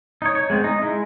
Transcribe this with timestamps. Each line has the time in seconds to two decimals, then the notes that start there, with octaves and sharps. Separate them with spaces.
0.22 D#4 C#5
0.35 C#5
0.50 G#3 B3 C4
0.64 D#4
0.82 G#3 E4